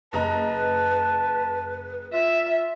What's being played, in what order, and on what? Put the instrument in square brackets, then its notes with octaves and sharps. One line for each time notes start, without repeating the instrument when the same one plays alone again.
[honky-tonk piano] F#1 D#5 A#5 [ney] B4 [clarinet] A5
[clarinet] F4 [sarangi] E5